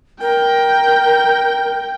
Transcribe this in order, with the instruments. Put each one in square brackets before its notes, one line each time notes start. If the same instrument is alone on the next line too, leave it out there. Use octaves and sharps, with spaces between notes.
[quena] A#4 [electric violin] G5